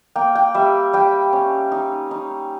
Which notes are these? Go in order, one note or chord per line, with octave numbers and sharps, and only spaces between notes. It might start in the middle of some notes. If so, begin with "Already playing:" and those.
A#3 G5
G5
G3 E5
G3 G5
C#4
D#4
D#4